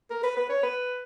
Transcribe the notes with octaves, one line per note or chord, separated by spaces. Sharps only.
A#4
B4
B4
C#5
B4